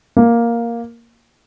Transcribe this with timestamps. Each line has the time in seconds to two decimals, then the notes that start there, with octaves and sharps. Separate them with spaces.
0.17 A#3